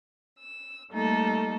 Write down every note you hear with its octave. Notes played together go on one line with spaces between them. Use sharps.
E6
G3 A3 A#3 D#4 A4